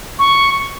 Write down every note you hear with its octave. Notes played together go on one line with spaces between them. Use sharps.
C#6